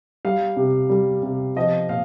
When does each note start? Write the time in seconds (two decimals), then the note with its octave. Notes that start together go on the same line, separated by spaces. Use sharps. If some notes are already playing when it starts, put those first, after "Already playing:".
0.25 G3 F5
0.57 C3
0.90 G3
1.23 C3
1.56 F3 D#5
1.89 A#2 F5